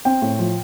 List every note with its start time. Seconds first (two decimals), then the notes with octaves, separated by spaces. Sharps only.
0.05 C4 G5
0.22 A2
0.39 F3